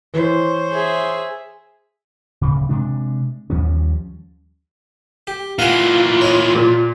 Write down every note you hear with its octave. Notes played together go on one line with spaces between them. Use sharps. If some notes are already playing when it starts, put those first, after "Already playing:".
E3 C5 C#5
G#4 E5
D1 C#3
C3 G#3 D4
D#2 F3 G3 C#4
G4
A#2 E3 F4 F5 F#5 G#5
C#5 D#5
A#2